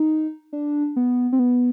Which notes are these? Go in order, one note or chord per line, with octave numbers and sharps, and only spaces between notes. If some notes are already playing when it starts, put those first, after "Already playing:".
Already playing: D#4
D4
B3
C4
B3